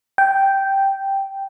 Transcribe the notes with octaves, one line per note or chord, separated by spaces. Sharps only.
G5